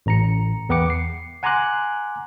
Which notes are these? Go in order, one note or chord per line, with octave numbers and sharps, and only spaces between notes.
A1 A#5 C#7
E2 B3 B4 G5 D6 C#7
C7
F#5 G#5 A#5 C6 D6 F#6